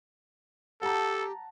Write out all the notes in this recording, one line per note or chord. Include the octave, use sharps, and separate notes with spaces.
G4 A4 F#5 A5 A#5